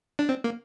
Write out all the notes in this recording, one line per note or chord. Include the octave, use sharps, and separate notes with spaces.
D4
C4
A#3